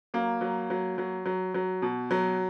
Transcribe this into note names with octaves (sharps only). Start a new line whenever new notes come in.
F#3 A#3
F#3
F#3
F#3
F#3
F#3
B2
F#3